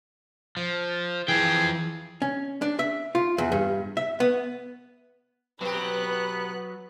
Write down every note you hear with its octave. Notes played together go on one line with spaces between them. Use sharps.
F3
E3 F3 G#4 G5
C#4
D4
E5
F4
E2
G2
E5
B3
B2 F#3 B3 G4 B4 F#6